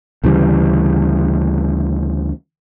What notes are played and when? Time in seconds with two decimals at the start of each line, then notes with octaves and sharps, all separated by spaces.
0.24 D2 C#3 E3 G3